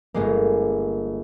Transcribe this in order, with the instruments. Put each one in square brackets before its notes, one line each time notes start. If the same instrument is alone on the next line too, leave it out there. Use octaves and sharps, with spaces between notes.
[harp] G1 G#3 A#3